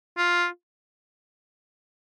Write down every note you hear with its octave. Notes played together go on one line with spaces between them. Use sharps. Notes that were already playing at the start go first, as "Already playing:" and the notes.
F4